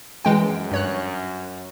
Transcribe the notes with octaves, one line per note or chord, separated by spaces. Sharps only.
F#2 E3 G#3 G5
G2 C#5 F#6